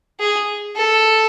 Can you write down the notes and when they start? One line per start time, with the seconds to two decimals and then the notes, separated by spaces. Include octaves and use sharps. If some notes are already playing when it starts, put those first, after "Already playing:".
0.20 G#4
0.75 A4